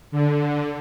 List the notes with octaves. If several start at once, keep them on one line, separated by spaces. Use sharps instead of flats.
D3